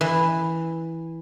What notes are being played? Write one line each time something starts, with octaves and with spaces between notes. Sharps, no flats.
E3